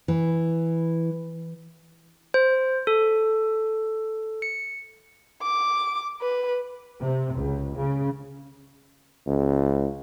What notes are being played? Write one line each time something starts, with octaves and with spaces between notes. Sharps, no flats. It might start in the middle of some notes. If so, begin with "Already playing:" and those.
E3
C5
A4
C#7
D6
B4
C3
C#2
C#3
C#2